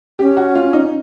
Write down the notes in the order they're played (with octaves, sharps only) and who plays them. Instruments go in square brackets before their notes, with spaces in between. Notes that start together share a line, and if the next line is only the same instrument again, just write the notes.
[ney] C#4 [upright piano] G4
[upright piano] F#4
F4
D#4